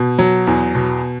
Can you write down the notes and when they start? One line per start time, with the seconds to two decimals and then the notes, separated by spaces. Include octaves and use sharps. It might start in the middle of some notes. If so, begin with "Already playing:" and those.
Already playing: B2
0.19 F#3
0.47 E2
0.75 B2